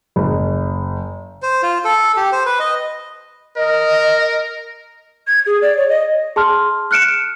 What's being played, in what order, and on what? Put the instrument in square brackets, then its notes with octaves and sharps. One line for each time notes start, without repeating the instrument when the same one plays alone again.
[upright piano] F#1
[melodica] C5
F4
A4
G4
C5
B4
D#5
[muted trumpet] A#4 [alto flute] D#5
[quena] G#6
G#4
D5
C#5
D#5
[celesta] G#4 A5 C6 F6
F6 F#6 C#7 D7 E7